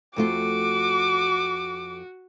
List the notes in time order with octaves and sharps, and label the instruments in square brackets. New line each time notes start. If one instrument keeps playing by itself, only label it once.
[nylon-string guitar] F2 A3 F4 [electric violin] F#4 [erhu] D6